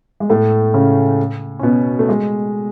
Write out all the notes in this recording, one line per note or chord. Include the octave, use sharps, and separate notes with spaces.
G#3
A2 A3
C#3 C#4
C#4
B2 B3
A3
G#3